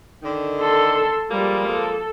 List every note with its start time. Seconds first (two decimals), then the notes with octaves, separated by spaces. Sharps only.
0.23 D3 D#3
0.60 A4 C6
1.31 F3 G3 G#3 A#3
1.69 A4